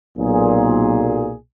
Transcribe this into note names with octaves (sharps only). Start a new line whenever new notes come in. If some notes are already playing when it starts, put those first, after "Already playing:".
B1 A#2 G#4